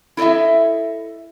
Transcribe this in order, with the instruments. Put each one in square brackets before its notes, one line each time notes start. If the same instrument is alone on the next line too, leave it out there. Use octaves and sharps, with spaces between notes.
[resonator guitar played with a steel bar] E4 A4 C#5 D#5 E5